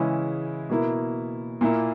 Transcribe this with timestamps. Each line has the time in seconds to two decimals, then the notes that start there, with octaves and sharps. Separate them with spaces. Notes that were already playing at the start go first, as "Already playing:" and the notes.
Already playing: C#3 E3 G#3 C#4 E4
0.70 B2 A#3 E4
1.61 A#2 A#3 E4